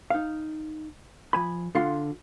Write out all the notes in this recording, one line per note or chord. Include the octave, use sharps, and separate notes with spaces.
D#4 F5
F3 G#5 B5
D3 F4 F5 F#5 C6